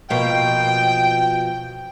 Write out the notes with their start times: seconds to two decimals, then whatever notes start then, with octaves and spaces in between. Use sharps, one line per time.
0.10 B2 F3 A#3 G5